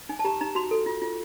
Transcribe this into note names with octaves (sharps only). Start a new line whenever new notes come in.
D#4 G#5
A5
G4 A#5
D#4 A#5
F#4 C6
A4
F4
F4